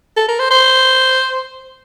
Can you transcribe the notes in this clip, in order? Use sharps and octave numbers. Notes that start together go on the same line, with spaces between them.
A4
A#4
C5
C5